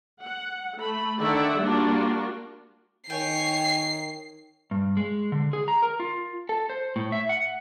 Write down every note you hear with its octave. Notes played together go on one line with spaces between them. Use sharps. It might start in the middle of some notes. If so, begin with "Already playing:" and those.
F#5
A3 B5
D3 D#3 D5 E5 F#5
G3 A#3 D4 F4 F#4
D#3 C#5 G5 G#5 C7
G2
G#3
D3
G#4
A#5
A#4
F4
A4
C5
A2
E5
F#5